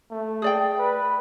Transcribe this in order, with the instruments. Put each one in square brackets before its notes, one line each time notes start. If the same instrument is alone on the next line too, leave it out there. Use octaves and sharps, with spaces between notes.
[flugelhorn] A3
[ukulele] G#4 D5 G5
[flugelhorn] B4